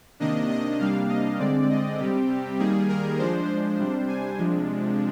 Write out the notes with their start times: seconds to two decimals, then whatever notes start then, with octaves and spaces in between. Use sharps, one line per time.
0.20 C3 D#3 A#3 D4 D#5
0.50 D#5
0.79 C3 G3 A#3 D4 F5
1.09 D#5
1.39 D3 G#3 C4 D5
1.70 D#5
1.99 C3 G3 C4 G4
2.59 D#3 G3 A#3 G#4
2.89 A#4
3.18 F3 G#3 D4 C5
3.79 C3 G3 D4
4.08 G#5
4.38 C3 F3 G#3 D4